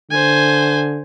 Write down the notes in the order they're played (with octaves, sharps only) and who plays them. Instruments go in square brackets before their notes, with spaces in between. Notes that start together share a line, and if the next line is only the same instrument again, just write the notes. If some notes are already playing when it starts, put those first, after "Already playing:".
[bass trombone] D3 [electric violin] C5 G#5